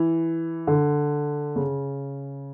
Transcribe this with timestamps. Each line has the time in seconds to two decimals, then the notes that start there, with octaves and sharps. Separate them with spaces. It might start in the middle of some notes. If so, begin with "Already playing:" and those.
Already playing: E3
0.67 D3
1.56 C#3